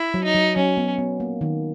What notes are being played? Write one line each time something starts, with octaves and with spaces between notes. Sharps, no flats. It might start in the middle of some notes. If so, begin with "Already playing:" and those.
Already playing: E4
F#3
D#4
F#3
F#3 C#4
B3
B3
A#3
D#3